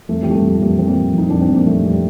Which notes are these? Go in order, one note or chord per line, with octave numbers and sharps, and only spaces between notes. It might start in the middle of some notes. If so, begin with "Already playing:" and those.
F2 A3
G3
F2 A3
G3
F3 A3
F2 G3 A#3
F3 C4
G3 A#3
F3
F2 D#4
F2 D4
C4
F2
A#3
F2 A3
F2 G3
G3